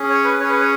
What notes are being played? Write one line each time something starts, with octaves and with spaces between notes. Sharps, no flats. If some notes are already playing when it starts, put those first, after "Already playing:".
Already playing: C#4 G#4
C#5
B4
C#4 G#4 C#5
B4
C#5